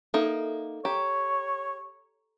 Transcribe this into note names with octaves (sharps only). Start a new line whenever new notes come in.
A#3 D#4 A4 E5
G4 C#5 A#5